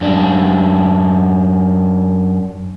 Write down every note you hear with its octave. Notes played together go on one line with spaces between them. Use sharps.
F#2 D4